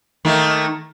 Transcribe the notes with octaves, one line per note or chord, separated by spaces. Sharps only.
D#3 A3 A#3